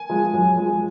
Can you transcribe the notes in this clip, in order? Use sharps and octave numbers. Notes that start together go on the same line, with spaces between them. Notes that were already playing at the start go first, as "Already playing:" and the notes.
Already playing: G#5
F3 G#3
F#2
F3 G#3